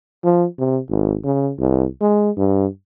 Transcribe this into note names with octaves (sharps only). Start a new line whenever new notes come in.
F3
C3
G#1
C#3
C2
G#3
G2